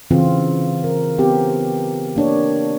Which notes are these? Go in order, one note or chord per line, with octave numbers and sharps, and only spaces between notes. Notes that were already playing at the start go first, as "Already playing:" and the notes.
C#3 E3 C4 F4
A#4
B3 C4 G4
A#3 D4 C#5